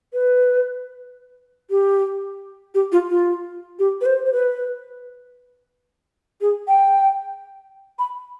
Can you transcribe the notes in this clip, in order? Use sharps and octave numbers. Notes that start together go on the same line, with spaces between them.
B4
G4
G4
F4
F4
G4
B4
C5
C5
B4
G#4
G5
B5